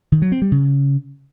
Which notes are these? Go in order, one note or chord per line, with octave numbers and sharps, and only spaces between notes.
D#3
F#3
C4
G3
C#3